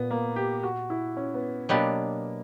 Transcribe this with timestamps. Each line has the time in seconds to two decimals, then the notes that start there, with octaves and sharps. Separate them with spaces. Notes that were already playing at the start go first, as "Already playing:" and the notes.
Already playing: A#2 B3
0.11 A#3
0.36 G4
0.63 F#4
0.90 E4
1.17 C#4
1.34 B3
1.69 B2 F#3 A#3 B3 D4 G4